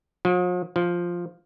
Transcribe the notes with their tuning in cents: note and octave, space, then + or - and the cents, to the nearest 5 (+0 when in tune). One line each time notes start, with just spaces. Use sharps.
F3 +45
F3 +0